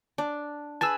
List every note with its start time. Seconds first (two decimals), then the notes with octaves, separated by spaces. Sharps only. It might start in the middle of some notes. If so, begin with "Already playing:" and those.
0.18 D4
0.81 G#4 B4 G#5 A5 E6